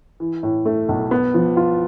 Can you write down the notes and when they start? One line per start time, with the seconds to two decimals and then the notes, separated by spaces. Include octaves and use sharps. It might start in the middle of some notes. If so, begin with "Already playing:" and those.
0.20 E3
0.43 A2
0.66 A3
0.89 B1
1.11 B3
1.34 F3
1.57 F4